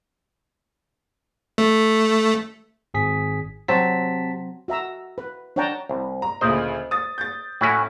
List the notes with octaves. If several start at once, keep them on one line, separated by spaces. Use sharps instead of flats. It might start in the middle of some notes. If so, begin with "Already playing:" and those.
A3
G#1 G#4 B6
C3 F#3 C4 A5 B6
F#4 E5 A#5 E6
B4
D4 C#5 F#5 G5 A5 A#5
C2
A#5
D2 A#2 C#3 C5 D#5
D#6 A6
G6 A6
A2 C#4 E4 F#4